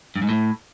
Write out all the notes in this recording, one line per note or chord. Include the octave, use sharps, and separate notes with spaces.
G2
G#2
A2